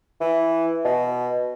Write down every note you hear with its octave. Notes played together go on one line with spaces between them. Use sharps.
E3
B2